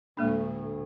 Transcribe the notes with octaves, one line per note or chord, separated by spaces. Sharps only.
D2 A2 G#3 A#3 D4